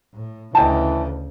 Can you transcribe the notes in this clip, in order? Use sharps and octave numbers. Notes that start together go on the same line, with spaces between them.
A2
D2 C#3 E3 D#5 G5 A5